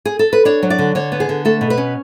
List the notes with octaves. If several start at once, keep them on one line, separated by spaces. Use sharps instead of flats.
G#4
A4
B4
D4 C#5
F#3
D5
D3
D3 C#5
B3
G#4
D3
A3 A4
B2
B4
C#4